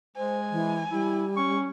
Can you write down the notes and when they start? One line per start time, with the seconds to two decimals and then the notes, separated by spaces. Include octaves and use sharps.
0.17 G#3 C5 G#5
0.51 E3
0.92 G3 E4
1.37 C#4 C#6